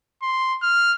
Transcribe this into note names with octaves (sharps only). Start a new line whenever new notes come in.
C6
F6